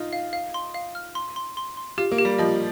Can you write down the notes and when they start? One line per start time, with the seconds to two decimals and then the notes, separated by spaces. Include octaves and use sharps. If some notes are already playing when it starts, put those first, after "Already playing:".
Already playing: D#4 F4
0.13 F5
0.33 F5
0.54 C6
0.74 F5
0.95 F6
1.15 C6
1.36 C6
1.57 C6
1.77 C6
1.98 F4 G4
2.12 A#3
2.18 G4
2.25 G3
2.39 F3 D#5